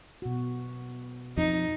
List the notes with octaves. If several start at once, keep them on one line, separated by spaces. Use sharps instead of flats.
B2 F#4
F2 D#4